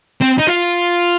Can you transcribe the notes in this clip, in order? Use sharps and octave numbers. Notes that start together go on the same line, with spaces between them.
C4
D#4
F4